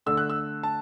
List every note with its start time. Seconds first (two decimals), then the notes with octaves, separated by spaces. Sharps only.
0.06 D3 A3 E6
0.17 F#6
0.30 E6
0.63 A5